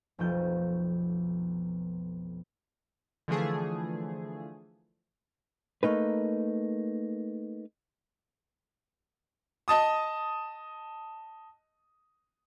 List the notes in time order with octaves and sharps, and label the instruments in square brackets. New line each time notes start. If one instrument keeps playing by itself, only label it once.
[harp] F1 B1 B2 F3 F4 G6
[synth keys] D3 E3 F3 A3 G#4
[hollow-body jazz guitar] A3 A#3 D#4 B4
[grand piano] D#5 A5 D#6